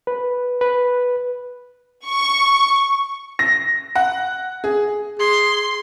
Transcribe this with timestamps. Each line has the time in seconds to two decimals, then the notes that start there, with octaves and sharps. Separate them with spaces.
0.07 B4
0.61 B4
2.06 C#6
3.39 A#6
3.95 F#5
4.64 G#4
5.19 G#4 C6